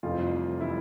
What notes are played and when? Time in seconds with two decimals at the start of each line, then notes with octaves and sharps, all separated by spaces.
0.03 F1 F2 E3 G3 F4
0.61 E3 G3 E4